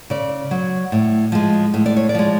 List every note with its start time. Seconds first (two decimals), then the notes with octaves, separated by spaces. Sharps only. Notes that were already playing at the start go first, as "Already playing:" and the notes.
0.10 C#3 D5
0.51 F#3
0.92 A2
1.32 F3 G#3
1.74 A2
1.86 D5
1.97 C#5
2.09 D5
2.15 F3 G#3